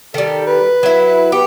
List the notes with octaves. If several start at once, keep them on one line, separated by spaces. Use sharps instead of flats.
D#3 G3 A4
B4
F#3 E4
B3 G4